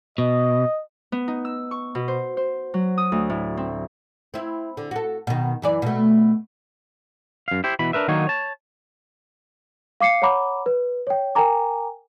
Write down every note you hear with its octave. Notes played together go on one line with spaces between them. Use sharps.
B2 D#5
B3
D#4
E6
C#6
B2
C5
C5
F#3
D#6
D2
A2
C4
C4 E4
D3
F#4 A4
B2 D#3
F#2 E3 D5
B2 A3
F#2 F5
E4 G4 C5
B2 E3 B5
D4 A#4 B4 E5
D3 D#3 F#3 A#3 D#4 C#5
C#5 A5
F5 D6 C7 C#7
C#5 F#5 A#5 B5 D6
B4
C#5 G5
A#4 G5 G#5 A#5 D6